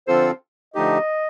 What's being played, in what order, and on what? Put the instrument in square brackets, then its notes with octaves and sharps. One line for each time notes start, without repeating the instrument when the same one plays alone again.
[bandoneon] D3 F3 C4 F4 A4 [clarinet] C5
[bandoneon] D3 F3 A3 D#4 G4 [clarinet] D#5